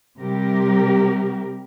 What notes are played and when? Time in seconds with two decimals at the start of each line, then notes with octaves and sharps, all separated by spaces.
0.19 C3 G3 G4 A#4